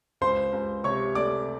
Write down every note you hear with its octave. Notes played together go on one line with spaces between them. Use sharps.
C#2 C5 C6
C#2
C3 C#5 C#6
A3 D5 D6